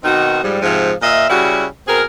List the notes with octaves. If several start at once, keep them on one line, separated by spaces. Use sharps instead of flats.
B2 D#3 C4 D#4 F#4
G#2 F3 G3
G#2 C3 F3
A#2 F4 D#5 E5
C#3 G3 E4 F#4
B2 C4 G#4 A#4